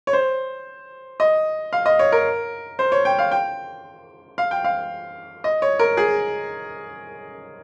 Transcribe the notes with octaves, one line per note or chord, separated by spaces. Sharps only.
C#5
C5
D#5
F5
D#5
C#5
A#4
C5
C#5
G5
F5
G5
F5
G5
F5
D#5
C#5
A#4
G#4